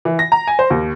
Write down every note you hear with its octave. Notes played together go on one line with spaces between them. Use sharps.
E3
A#6
A#5
G#5
C5
D#2